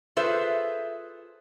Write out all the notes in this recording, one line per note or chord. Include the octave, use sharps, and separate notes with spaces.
F4 G#4 A4 B4 C5 E5